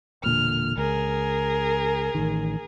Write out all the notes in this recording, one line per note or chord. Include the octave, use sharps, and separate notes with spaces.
E1 A#2 D3 F6
C#2 G#4 A#4
A1 D#3